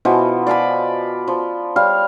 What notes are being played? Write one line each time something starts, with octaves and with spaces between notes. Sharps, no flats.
B2 E3 F3
D5 F5 G#5 B5
F3
G3 C#5 F5